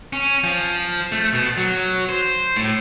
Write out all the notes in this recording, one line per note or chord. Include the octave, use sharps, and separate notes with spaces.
C#4
F3
A3
B2
F#3
C5
A2